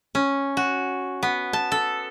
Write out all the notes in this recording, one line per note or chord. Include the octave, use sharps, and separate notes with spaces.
C#4
F#4
B3
A5
A4